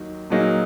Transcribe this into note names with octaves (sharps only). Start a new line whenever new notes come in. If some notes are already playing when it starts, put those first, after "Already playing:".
Already playing: D#2 D#3 F#3
A#2 F#3 A#3 D#4 G#4